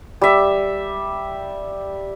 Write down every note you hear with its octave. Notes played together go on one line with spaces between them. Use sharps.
G3 E5